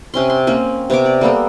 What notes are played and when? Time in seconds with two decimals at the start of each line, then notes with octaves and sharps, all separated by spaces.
0.14 C3 C#4 C6
0.30 C6
0.47 A#3 C4 C#4
0.90 C3 B3 C#5 D6
1.06 D5
1.21 G3 A#3 B3 A4